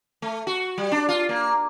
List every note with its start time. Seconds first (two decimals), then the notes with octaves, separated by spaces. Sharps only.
0.22 A3
0.47 F#4
0.78 G3
0.92 D4
1.09 F4
1.29 A#3